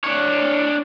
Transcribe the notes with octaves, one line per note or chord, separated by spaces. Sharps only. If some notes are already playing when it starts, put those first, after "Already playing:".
D4 C#5